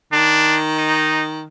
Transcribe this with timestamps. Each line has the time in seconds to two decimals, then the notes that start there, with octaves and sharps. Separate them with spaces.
0.13 D#3 D4
0.77 D#4